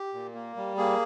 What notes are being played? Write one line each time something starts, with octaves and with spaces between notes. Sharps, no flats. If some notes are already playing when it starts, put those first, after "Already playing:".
Already playing: G4
A#2
A#3
G3
A#3 G#4